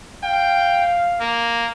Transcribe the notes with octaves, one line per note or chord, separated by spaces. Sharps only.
F5 G5
A#3